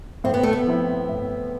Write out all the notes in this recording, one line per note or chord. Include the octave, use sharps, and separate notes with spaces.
A2 C4
B3
A3
B3
F3 C4 E4
A2